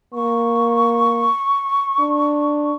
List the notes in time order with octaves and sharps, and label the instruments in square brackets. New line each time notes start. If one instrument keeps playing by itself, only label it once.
[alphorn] A#3 [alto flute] C#6
[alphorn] D4